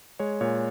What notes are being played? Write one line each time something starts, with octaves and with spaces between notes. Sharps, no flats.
G#3 C#5
A#2 C#5